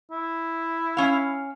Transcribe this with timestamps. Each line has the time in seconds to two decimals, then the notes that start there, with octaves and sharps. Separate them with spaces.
0.11 E4
0.97 C#4 F5